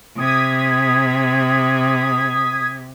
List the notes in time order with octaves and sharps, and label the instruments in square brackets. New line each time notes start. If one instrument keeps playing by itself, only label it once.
[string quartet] C3 [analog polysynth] D#6 G#6 B6